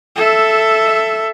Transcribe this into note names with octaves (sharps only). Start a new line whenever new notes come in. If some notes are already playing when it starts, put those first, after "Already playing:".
A4 E5